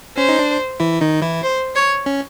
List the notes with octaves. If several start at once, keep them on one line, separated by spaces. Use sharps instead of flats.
C#4 C5
D#4
D4
E3 E4
D#3 D#4
E3 E4
C5
C#5
C#4